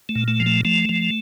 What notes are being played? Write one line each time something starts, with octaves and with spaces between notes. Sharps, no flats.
A3
A#2
A3
F3
A3
F3 A3
F3